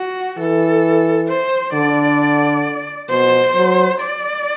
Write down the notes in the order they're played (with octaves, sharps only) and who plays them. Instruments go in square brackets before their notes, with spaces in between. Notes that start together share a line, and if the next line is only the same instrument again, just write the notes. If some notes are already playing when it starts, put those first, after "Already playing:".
Already playing: [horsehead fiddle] F#4
[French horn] E3 [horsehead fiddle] A4
[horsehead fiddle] C5
[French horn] D3 [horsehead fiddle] D5
[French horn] B2 [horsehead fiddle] C5
[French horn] F#3
[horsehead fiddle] D5